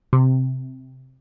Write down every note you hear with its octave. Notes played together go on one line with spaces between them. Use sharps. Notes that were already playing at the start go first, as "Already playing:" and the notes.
C3